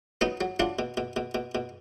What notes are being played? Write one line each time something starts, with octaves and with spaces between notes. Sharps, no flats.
F#3 B3 D#4
F#3
F#3 D4 F4
B2
B2
B2
B2
B2